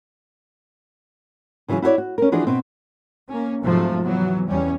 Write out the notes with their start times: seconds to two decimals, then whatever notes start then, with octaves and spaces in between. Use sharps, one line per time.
1.68 C#3 E3 F#3 F4 G#4
1.82 E4 F#4 G#4 C#5 D5
1.98 F#4
2.18 C#4 A#4
2.32 E3 F3 D4 F#4 G#4 D#5
2.47 B2 B3 C4
3.30 A#3 C#4
3.63 G#2 C3 F3 F#3 A3
4.03 E3 F#3 B3
4.47 E2 G3 C#4